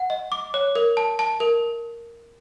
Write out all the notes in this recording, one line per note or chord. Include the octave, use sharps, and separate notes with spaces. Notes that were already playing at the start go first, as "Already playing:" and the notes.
Already playing: F#5
D#5
D6
C#5
A#4
A5
A5
A#4